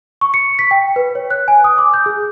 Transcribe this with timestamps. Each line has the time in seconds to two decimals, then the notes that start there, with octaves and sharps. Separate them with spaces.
0.21 C#6
0.34 C#7
0.59 B6
0.71 G5
0.96 B4
1.15 C#5
1.30 F#6
1.48 G#5
1.64 D#6
1.78 D6
1.94 G6
2.06 G#4